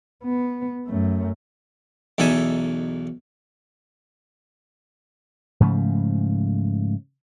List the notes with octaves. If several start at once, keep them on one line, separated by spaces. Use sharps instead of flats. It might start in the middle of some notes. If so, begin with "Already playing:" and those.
B3
F#2 A3
B1 E2 D#4 A4 E5 G#5
G#2 C#3 F3 A3